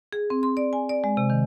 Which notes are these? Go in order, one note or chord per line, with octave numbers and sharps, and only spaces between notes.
G#4
C4
C6
D5
G#5
D5
G#3
C3
D#3